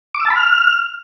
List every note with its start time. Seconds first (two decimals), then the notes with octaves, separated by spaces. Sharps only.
0.14 D6
0.20 E6
0.25 A5
0.30 B5
0.35 F6